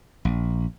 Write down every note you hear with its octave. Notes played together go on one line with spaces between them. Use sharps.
A#1